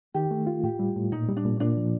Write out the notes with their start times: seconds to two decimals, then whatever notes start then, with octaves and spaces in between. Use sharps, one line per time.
0.14 D#3 G4
0.31 A3
0.47 F4
0.63 A2 G4
0.79 G3
0.96 A2
1.12 A#2 D#4
1.29 G3
1.37 D4
1.45 A#2
1.60 A#2 D4
1.77 F3